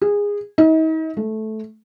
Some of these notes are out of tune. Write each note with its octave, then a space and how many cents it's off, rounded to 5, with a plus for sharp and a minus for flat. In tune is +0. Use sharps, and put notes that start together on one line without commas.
G#4 -20
D#4 +40
A3 -10